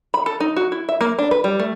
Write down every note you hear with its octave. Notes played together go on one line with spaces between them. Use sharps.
B5
A4
D#4
F#4
E4
E5
A#3
D4
B4
G3
A3